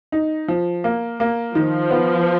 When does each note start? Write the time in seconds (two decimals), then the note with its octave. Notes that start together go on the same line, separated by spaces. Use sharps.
0.12 D#4
0.48 F3
0.84 A#3
1.20 A#3
1.55 D#3 F3
1.91 B3